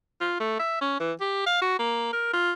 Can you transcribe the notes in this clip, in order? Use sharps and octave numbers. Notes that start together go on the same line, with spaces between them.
F4
A3
E5
C#4
E3
G4
F5
F#4
A#3
A#4
F4